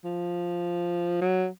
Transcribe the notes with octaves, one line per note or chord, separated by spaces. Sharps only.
F3
F#3